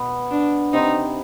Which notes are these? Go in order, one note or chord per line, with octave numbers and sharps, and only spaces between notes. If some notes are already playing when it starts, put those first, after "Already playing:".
Already playing: B2 B3
D4
C3 C4 D#4